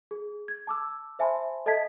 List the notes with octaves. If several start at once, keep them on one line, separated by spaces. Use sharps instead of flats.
G#4
G#6
A5 D6 E6
C5 E5 G#5 A5 B5 C6
A4 D#5 E5 A5 G#6 B6